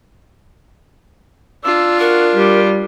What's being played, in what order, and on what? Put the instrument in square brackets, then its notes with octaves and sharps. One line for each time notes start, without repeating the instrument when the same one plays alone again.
[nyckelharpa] D4 F4 [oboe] E6
[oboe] F#4 [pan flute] A#4
[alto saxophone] G3 [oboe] G4